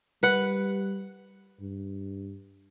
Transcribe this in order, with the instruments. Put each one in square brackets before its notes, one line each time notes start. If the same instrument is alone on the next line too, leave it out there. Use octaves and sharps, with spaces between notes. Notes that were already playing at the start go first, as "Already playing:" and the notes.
[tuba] G3 [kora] B4 F#5
[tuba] G2